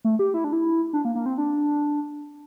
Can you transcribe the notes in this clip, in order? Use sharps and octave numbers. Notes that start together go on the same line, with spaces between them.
A3
G4
E4
D4
E4
D4
A#3
A#3
C4
D4